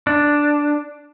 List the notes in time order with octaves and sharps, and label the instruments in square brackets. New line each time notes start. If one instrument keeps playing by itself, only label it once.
[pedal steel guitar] D4